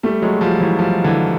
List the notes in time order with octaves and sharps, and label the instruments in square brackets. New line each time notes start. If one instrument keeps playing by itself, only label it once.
[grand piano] G3 A3
F#3 G#3
F3 G3
E3 F#3
F3 G3
D3 E3